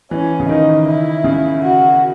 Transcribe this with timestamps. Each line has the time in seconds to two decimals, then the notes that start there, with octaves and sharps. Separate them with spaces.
0.11 E3 C#4
0.40 C#3
0.49 D#3 D#4
0.87 E4
1.24 C#3
1.62 F#4